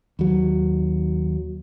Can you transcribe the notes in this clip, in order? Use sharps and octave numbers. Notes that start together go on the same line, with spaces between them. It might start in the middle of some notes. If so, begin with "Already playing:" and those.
D#2 F#3